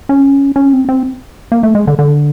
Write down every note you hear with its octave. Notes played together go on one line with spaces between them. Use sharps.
C#4
C#4
C4
C4
A#3
A3
G#3
D3
D3